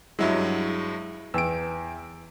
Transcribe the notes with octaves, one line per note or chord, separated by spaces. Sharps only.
G2 F#3 G#3 E4 E5
E2 G5 E6 D7